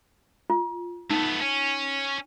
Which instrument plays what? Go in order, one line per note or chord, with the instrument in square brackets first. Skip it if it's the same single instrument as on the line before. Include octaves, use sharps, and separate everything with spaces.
[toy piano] F4
[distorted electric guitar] A3 B3 [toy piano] D#4
[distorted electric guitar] C#4